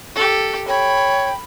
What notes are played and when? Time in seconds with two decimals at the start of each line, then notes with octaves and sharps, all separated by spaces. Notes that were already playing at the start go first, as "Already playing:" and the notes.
0.15 G4 A4
0.68 C#5 G5 B5